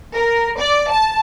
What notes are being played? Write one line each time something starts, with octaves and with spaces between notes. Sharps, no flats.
A#4
D5
A5